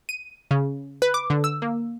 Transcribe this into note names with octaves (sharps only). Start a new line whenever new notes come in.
D#7
C#3
B4
D6
D3
E6
A#3